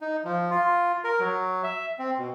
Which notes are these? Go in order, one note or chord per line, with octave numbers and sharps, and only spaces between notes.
D#4
F3
F4
A#4
F#3
E5
C4
B2